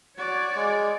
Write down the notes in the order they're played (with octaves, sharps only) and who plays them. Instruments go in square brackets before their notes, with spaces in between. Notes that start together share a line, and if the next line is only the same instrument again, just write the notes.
[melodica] F#4 [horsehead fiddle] C#5 D5
[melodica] G#3